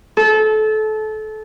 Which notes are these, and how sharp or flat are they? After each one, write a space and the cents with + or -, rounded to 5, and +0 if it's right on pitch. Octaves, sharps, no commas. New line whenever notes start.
A4 -25